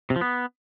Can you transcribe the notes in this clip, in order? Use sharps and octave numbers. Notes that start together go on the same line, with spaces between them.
C3
F3
B3